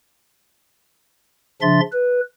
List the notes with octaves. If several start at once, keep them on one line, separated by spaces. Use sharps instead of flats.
C#3 F3 D4 E5 C6 A6
B4